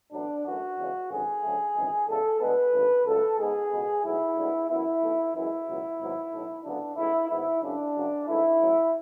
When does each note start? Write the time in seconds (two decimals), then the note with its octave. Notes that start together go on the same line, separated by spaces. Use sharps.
0.12 A1 A2 F#3 B3 D4
0.45 F#2 E3 A3 F#4
0.77 E2 C#3 G#3 B3
1.10 G#1 F#2 D3 F#3 B3 G#4
1.43 D2 C#3 F#3 A3
1.75 G#1 F#2 C#3 E3 G#3
2.08 E2 C#3 G#3 A4
2.40 D2 D3 G#3 B3 B4
2.73 G#1 F#2 D3
3.06 C#2 C#3 F#3 A3 A4
3.39 G#2 G#3 B3 G#4
3.71 C#2 B2 G#3 B3
4.04 B1 A2 G#3 B3 E4
4.36 D2 D3 G#3 B3
4.69 F#2 E3 B3 E4
5.01 B1 B2 A3
5.34 F#2 E3 G#3 E4
5.66 C#2 B2 F#3
5.99 G#1 G#2 F#3 B3
6.32 B1 A2 F#3 A3
6.64 D2 C#3 F#3 B3 D4
6.97 A1 A2 G#3 B3 E4
7.29 G#1 G#2 G#3 B3 E4
7.62 F#2 C#3 G#3 D4
7.95 F#2 C#3 F#3
8.27 G#2 E3 A3 E4
8.60 A1 A2 F#3